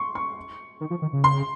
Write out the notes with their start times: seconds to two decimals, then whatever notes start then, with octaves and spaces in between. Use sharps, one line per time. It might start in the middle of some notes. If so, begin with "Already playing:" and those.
Already playing: C6 C#6
0.15 C#6
0.81 D#3
0.90 F3
1.02 D#3
1.13 C#3
1.24 C6